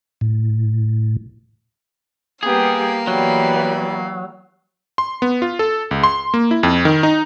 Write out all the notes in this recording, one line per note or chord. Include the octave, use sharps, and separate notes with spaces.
A2
G3 A#3 B3 G4 G#4 F5
E3 F#3 G3 B3
C6
B3
F4
A4
C#2
C6
A#3
E4
F2
D#3
D#4